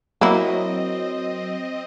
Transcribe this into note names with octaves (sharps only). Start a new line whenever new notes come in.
F#3 A#3 C4 E4 D#5